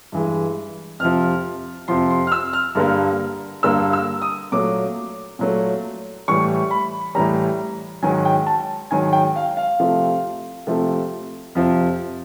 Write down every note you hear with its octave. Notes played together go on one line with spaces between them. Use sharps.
G2 E3 G#3
F2 C3 F3 F6
F2 C3 F3 C6
C6
F6
E6
F6
G2 D3 G3 A#3
G2 D3 G3 A#3 E6
E6
D#6
A#2 F#3 A3 D6
A#2 F#3 A3
A2 E3 G3 C#6
B5
A2 E3 G3 A#5
G#2 D#3 F#3 G#5
G5
A5
G#2 D#3 F#3 G#5
G5
F5
F5
C3 F3 A3
C3 F3 A3
F2 C3 F3